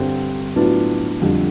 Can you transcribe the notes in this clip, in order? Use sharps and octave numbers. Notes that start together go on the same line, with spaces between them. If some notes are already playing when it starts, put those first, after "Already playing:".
Already playing: G2 D3 G3 C4
A2 F#3 B3 D4 F4
F2 D3 G3